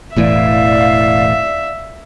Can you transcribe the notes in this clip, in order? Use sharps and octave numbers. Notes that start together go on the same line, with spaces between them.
E1 A2 E3 D5 E5 F5